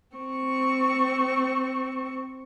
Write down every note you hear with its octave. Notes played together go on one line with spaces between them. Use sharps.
C4 C#6